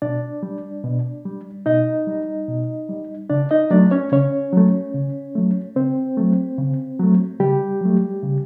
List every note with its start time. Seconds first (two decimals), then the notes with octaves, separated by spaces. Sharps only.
0.02 B2 D4 D5
0.43 G3
0.84 B2
1.26 G3
1.66 B2 D#4 D#5
2.07 G3
2.48 B2
2.89 G3
3.30 C#3 D4 D5
3.51 D#4 D#5
3.71 F#3 A3 D4 D5
3.91 C#4 C#5
4.12 C#3 C#4 C#5
4.53 F#3 A3
4.94 C#3
5.35 F#3 A3
5.76 C#3 C4 C5
6.17 F#3 A3
6.58 C#3
6.99 F#3 A3
7.40 C#3 G3 G4
7.81 F#3 A3
8.22 C#3